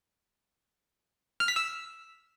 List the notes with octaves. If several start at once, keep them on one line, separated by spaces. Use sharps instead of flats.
F6
B6
E6